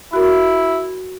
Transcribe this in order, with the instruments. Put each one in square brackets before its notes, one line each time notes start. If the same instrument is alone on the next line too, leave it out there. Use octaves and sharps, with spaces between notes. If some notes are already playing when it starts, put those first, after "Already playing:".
[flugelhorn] E4 [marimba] F#4 A#4